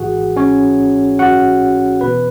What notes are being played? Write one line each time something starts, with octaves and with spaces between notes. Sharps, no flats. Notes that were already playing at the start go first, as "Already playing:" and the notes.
Already playing: G#1 G#2 E3 F#4 G#4 F#5
C#4 C#5
F#4 F#5
E2 B2 B4